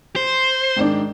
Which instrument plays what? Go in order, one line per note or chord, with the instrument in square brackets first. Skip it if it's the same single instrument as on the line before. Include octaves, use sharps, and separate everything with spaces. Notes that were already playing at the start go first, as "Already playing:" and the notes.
[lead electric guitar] C5
[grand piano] G#2 D#3 D4